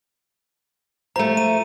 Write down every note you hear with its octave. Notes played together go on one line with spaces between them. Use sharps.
F3 A3 A#5
D#7